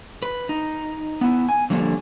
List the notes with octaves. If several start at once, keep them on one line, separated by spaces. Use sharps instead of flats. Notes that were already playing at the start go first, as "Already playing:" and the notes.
B4
D#4
B3 E4
G#5
D3 F3 G3 A3 A#3 D4